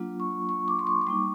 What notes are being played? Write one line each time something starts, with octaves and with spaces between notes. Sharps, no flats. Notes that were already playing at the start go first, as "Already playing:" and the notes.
Already playing: F#3 A#3 D4 F4
C#6
C#6
D6
C6
C#6
D6
G3 A#3 D#4 C#6